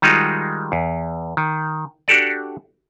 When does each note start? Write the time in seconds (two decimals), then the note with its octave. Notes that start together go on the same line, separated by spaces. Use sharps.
0.02 D#3 G3 G#3 D#4 F4 F#4
0.72 E2
1.37 D#3
2.08 D4 F#4 G4 A4 D5